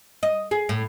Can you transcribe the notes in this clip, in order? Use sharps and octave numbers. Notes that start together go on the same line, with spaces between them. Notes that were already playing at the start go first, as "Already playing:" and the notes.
D#5
G#4
A2